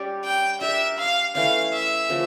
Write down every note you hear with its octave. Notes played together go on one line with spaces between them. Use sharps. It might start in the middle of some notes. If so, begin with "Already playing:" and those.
Already playing: G3 C#4 G4 D5
G5
D4 G4 A#4 E5
F5
E3 A3 C#4 F5
E5
C#3 F3 A#3